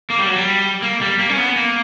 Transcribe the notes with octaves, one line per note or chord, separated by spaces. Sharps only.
A#3
G3
F#3
G3
A#3
G3
A#3
C#4
B3
A#3